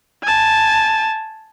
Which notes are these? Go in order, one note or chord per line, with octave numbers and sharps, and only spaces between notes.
G#5 A5